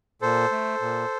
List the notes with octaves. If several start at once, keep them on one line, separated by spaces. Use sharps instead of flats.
A#2 A4 C5
A3
A#2